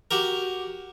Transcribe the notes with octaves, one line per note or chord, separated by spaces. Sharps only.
F#4 G4 A#4